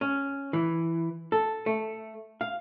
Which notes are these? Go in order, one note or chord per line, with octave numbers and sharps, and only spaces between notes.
C#4
E3
A4
A3
F5